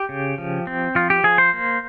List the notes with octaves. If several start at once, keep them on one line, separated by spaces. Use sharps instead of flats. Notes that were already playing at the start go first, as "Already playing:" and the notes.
Already playing: G4
C#3
F3
C4
F3 F4
G4
F3 G#4
C5
A#3